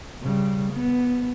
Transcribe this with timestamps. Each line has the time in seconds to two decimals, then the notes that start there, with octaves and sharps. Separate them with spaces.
0.22 C#3 G3
0.73 B3